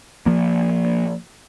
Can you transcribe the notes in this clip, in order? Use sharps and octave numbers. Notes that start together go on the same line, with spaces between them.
F3 A#3